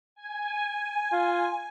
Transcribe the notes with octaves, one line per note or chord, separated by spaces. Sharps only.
G#5
F4